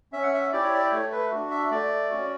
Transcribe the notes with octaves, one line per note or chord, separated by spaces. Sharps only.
C#4 E5
F#5
E5
E4 G4 D5
C#5
D5
A3 C#5
B4
D4 F#4
E5
A3 D5
C#4 F#4